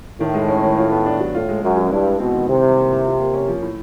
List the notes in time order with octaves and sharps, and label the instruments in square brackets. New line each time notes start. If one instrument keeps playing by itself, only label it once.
[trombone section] A2 [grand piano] D#3
[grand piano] G#3
C#4
D#3
F4
B3
D4
F#3
[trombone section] A2 [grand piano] F4
[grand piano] G#3
[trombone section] F#2 [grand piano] C#4
[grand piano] B2
[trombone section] G2 [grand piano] E4
[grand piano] G#3
[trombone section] B2 [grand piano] C4
[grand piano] D#3
[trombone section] C3 [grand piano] E3
[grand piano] G3
A#3
E3
F4
A#3
C#4
F3
A2